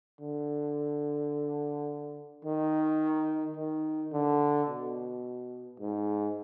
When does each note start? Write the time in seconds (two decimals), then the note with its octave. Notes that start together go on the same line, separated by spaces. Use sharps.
0.21 D3
2.45 D#3
3.57 D#3
4.13 D3
4.69 B2
5.80 G#2